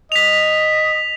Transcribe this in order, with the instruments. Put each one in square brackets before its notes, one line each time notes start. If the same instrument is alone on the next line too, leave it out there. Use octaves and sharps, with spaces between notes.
[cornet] D#5 [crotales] B6 F7